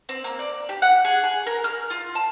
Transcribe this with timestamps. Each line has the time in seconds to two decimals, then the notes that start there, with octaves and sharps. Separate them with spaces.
0.09 C4
0.24 A#3
0.39 D5
0.69 G4
0.82 F#5
1.04 G#4
1.23 G#4
1.46 A#4
1.64 F6
1.90 F4
2.15 A5